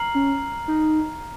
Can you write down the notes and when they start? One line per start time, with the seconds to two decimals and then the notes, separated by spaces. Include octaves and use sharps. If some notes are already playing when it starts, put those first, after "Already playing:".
Already playing: A#5 F6 C7 F#7
0.15 C#4
0.68 D#4